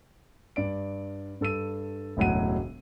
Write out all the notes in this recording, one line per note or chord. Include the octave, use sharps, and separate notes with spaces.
G2 D5 D7
G2 A4 E6 D#7
E1 C#2 A2 F#3 F#5 D#7